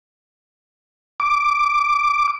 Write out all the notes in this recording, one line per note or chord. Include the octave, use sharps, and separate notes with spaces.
D6